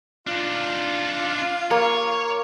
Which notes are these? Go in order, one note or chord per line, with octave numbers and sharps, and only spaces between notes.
D4 D#4 F4
A#3 C#5